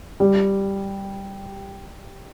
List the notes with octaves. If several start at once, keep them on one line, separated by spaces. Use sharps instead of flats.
G3